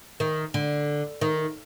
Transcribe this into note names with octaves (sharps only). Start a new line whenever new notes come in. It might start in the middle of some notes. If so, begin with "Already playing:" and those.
D#3
D3
D#3